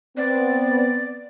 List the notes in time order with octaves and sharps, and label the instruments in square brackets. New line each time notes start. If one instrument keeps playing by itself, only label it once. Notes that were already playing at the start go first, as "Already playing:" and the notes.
[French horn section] B3 C4 [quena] D5